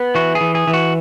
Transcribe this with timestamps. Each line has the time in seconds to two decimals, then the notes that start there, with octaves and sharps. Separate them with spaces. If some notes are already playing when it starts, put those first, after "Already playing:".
Already playing: B3
0.15 E3 F#4
0.35 G#4
0.41 E3
0.55 G#4
0.67 E3
0.74 F#4